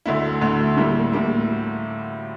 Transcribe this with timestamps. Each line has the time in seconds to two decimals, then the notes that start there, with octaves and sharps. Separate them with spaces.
0.06 D2 D3 A3 E4
0.42 D2 D3 A3 E4
0.77 A2 G3 A#3 E4
1.12 A2 G3 A#3 E4